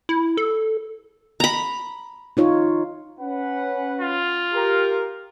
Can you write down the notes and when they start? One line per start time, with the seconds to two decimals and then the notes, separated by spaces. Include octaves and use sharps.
0.09 E4
0.37 A4
1.40 A#5 B5
2.37 D#4 F4 C#5
3.19 C#4 B4 F#5
4.00 F4
4.54 G4 A#4